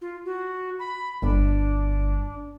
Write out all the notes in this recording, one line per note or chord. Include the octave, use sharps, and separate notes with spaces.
F4
F#4
B5
G1 D4